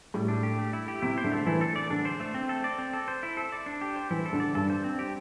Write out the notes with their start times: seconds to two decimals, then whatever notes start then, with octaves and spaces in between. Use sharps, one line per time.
0.14 A2 G3
0.28 D4
0.43 G4
0.59 A3
0.73 E4
0.88 G4
1.02 C3 E4
1.18 C5
1.24 D3
1.32 A3
1.46 E3 E4
1.61 A4
1.76 D5
1.90 D3 D4
2.05 C5
2.20 A3
2.34 C4
2.49 A4
2.64 D5
2.79 C4
2.94 A4
3.08 C5
3.23 E4
3.37 A4
3.52 D5
3.66 D4
3.81 G4
3.96 C5
4.10 E3 E4
4.26 A4
4.33 D3
4.40 D5
4.55 G2 A4
4.70 C5
4.84 C4
4.99 G4